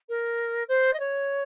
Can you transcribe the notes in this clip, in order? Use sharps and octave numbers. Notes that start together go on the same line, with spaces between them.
A#4
C5
D#5
C#5